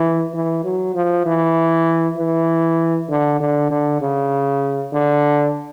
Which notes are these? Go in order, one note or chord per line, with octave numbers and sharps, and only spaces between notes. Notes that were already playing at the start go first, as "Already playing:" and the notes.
Already playing: E3
E3
F#3
F3
E3
E3
D3
D3
D3
C#3
D3